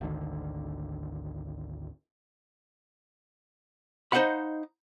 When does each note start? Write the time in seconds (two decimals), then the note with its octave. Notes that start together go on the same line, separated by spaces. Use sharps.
0.01 G#1 D2 D3 D#3
4.12 D#4 C5 D#5 F5 F#5 B5